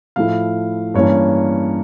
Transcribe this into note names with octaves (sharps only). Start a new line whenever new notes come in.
A2 F3 A3 E4 F5
G2 E3 A#3 C#4 C#5